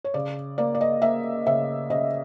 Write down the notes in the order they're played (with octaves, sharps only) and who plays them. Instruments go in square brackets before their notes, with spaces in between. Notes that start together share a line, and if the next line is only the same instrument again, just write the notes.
[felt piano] C#5
C#3 D5
A#3 D5
D5
D#5
A#3 E5
C#3 E5
C#3 D#5